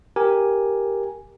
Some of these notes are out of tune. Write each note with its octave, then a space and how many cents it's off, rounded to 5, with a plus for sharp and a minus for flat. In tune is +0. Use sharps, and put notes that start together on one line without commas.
G4 +0 A#4 +0 G#5 +0